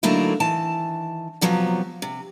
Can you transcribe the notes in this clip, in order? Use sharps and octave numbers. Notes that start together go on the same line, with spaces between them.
D3 F#3 A3 A#3 D#4 E4
D#3 E3 A5
C3 F3 F#3 B3
C3